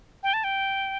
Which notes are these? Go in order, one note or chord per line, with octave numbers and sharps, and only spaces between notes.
G5
A5
G5